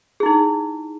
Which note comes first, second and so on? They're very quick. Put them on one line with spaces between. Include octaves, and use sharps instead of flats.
G#4 E4 D#4